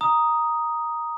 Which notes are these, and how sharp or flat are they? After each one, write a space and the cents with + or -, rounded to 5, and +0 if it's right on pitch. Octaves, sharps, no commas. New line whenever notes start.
A#5 +5 D#6 +0